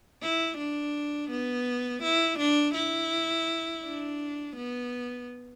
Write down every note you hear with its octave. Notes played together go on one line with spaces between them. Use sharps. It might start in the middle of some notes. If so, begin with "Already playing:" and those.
E4
D4
B3
E4
D4
E4
D4
B3